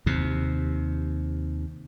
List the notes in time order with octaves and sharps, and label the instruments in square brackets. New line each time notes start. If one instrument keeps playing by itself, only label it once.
[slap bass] D#2 C3